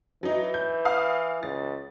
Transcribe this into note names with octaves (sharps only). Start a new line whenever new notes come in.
E3 F#3 D#4
G6
F5 D#6
C#2 A6